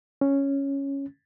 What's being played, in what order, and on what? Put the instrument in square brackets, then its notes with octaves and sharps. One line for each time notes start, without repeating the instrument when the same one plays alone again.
[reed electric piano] C#4